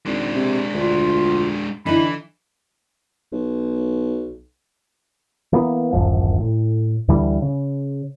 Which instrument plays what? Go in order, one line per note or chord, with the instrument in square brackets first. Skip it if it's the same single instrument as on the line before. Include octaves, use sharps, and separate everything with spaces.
[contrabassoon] G#1 [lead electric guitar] G#3 D4
[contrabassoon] C3
[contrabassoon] D2 [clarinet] F4
[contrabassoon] D3 [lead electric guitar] E3 [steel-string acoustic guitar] D#4 E4 [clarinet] B5
[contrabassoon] B1
[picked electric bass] E3 A#3 B3
D1 G#1 F#2 F3
A2
D2 D3 E3 G3
C#3